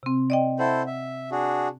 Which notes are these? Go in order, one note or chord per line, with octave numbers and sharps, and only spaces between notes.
C3 C4
D5 D#5 G5
E4 A4 C5 F#5
E5
D4 F#4 G#4